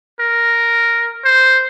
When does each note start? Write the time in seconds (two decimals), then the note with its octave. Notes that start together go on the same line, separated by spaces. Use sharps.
0.20 A#4
1.25 C5